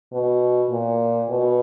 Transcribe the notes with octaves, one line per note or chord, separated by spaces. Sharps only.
B2
A#2
B2